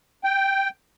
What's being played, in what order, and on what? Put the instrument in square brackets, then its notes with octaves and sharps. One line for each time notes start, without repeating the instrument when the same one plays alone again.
[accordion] G5